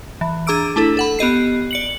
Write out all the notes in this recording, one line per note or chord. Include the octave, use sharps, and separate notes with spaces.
E3
D4 G#4 A#5 D6 E6 D7
A3 D4 E4 A4
A4 F#5 B5
B3 G4 D#5 C7
D5 C#7 F#7